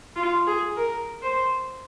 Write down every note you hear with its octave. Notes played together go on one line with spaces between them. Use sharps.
F4
G#4
A#4
C5